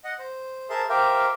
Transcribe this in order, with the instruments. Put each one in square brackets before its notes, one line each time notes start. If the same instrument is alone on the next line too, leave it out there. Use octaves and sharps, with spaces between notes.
[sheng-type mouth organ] D#5 F#5
C5
G#4 A#4 C5 E5 A5 C6
G4 A#4 C5 E5 F5 G5